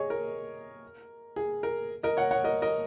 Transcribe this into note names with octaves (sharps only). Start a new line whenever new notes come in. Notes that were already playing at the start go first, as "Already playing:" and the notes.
Already playing: G#4 C#5 D#5 C#6
A#4
G#4
A#4
A#4 D#5
C#5 F#5
C#5 F#5
A#4 D#5
A#4 D#5